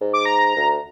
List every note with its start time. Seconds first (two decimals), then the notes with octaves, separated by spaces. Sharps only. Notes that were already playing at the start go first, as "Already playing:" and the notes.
0.01 G#2
0.13 D6
0.25 A#5
0.57 D2